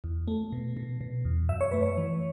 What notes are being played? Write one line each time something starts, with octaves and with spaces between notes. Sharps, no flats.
E2
A3
B2
B2
B2
E2
F#2 E5
C#5
A3 B4
C#5
E3